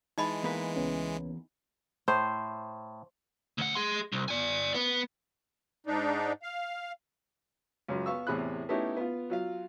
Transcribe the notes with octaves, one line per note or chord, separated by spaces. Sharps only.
E3 G#3 D#4 D#5 B5
E2 A#3 B4
C#2 B3 C#4
A2 C5
D2 F#5
G#4 C6
C2
D5 G#5
B3
G#2 D4 D#4
F5
C#2 F#2
B3 F5 C#6 E6
E2 A2 C3 G#4 B5 F#6
A3 B3 C#4 D#4 E4 G4
B3 F4
F#3 F4 F5